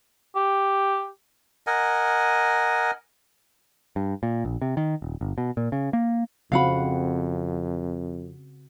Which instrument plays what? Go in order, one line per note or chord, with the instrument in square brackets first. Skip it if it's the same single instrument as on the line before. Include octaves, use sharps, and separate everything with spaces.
[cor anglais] G4
[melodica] A#4 D#5 F#5 G#5
[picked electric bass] G2
A#2
A#1
C3
D#3
D#1
G1
B2
A#2
C#3
A#3
[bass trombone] F2 [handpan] C#3 C4 F#4 [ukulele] F5 F#5 B5